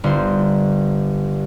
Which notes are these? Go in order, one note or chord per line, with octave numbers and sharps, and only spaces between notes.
G1 C5